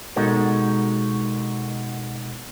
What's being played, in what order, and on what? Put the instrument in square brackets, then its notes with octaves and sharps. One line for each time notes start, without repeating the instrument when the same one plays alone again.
[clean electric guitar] B2 G#3 D#4 F#4 A4 A#4